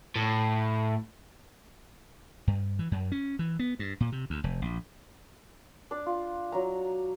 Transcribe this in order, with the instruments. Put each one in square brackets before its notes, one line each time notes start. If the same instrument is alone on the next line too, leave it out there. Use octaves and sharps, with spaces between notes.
[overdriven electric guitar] A2
[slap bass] G2
E3
F#2
C#4
E3
B3
G2
A#2
C3
D2
F1
A#1
[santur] D4 D5
F4
F#3 A#5